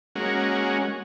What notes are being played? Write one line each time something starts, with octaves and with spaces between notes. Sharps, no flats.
G#3 A#3 C#4 F#4